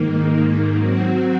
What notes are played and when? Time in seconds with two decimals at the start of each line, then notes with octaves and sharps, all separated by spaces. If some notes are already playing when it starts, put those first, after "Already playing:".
Already playing: G#2 D#3 A#3
0.78 F#3 C4 F#4